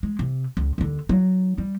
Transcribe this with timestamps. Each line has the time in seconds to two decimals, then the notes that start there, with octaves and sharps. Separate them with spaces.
0.03 G#3
0.19 C3
0.57 C#2
0.78 D#2 D3
1.09 F#3 D#4
1.58 G3